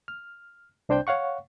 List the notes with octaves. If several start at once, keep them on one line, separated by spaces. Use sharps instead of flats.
F6
C2 D4 C5 G5 G6
C#5 F5 F#5 C#6